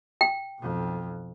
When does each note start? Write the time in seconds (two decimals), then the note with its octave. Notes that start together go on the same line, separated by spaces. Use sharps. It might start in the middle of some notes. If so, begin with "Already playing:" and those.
0.21 G5
0.59 B1 F2